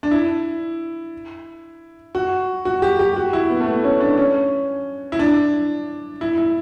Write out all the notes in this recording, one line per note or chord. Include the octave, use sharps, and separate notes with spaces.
D4
E4
F#4
F#4
G4
G4
F#4
E4
B3
A3
B3
C#4
D4
C#4
E4
D4
E4
E4